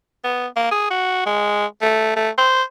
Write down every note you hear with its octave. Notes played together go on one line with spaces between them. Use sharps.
B3
A#3
G#4
F#4
G#3
A3
A3
C5